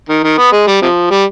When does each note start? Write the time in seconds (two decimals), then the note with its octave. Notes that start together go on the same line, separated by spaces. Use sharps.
0.09 D#3
0.23 D#3
0.38 B3
0.52 G#3
0.67 G3
0.82 C3 F3
1.11 G3